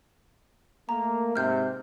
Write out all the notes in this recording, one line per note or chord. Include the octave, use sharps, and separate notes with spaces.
A3 A#3 A#5
G#2 C3 F6 G6